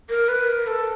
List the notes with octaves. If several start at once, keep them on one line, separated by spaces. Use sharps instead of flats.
A#4
B4
A#4
A4